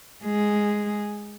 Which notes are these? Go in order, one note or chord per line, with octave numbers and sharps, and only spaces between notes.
G#3 G#4